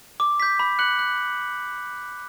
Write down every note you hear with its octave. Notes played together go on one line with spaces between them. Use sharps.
D6
G6 B6
B5
F#6 C#7 F#7
F#6